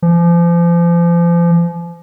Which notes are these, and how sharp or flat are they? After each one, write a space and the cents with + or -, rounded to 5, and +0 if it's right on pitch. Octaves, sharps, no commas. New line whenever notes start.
F3 -35